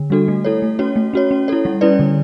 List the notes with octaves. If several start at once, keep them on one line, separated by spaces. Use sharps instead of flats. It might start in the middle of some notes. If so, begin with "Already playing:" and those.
Already playing: D3
G3 D4 F#4 A4
A3
E4 A4 C#5
A3
C#4 F#4 C#5
A3
C#4 F#4 C#5
C#4
E4 A4 C#5
G3
C#4 E4 B4 D5
D3